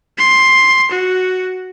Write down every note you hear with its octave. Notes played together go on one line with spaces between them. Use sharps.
C6
F#4